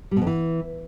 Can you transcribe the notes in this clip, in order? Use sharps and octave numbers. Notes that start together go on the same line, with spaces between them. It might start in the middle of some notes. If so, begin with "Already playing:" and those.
G3
B2
F2
E3